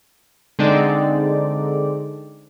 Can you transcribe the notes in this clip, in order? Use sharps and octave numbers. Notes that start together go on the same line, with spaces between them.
D3 G#3 C4 D#4 D5